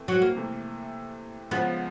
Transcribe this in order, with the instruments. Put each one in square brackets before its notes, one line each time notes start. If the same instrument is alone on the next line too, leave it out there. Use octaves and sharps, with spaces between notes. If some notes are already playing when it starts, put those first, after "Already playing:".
Already playing: [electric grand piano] E3 A3 C4
[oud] F#3
A#3
[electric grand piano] C3 E3 A3
[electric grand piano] C#3 F3 G#3 [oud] B3